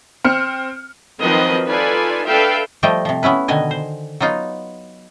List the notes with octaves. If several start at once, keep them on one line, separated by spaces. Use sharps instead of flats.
C4 F6 C#7
D#3 F3 F#3 C4 B4 D#5
D#4 F4 A4 B4 D5 G#5
D4 A4 B4 E5 F5 G5
F3 G3 A3 D#5 G5
C3 F3
B3 C#4 E4 B4
B2 D3 D#3 D#5 G#5
C5
F#3 B3 D#4 F4